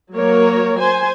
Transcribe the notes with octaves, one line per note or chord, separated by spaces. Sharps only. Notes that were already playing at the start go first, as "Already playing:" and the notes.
F#3 A#3 A#4 C#5
C5 G#5